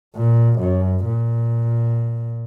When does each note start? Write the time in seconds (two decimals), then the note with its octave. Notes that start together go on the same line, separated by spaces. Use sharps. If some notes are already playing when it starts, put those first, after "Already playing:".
0.16 A#2
0.60 F#2
1.06 A#2